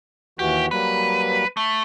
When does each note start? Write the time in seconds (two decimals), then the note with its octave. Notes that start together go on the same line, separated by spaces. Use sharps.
0.39 D#2 E3 F#4 G4
0.71 F#3 G3 A#3 B4
1.57 A3